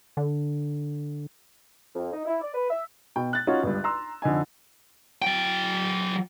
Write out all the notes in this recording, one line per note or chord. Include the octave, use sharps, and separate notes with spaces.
D3
F2
D#4
E4
D5
B4
E5
B2 G5
F#6 A6
C#4 D#4 F4 F#4 C#5
G1 C#2 G2
A#5 C6 E6
F2 D3 D#4 G#5
F#3 G5